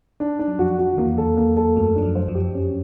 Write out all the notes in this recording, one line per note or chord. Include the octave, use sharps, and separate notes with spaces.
D4
D4
F#3
F2 F3 F#4
F#4
D#3
E2 E3 A#3
A4
A#3
A4
F#2 F#3 A3
F3 D4
F#2 F#3
C5
F2 F3
G4
C#4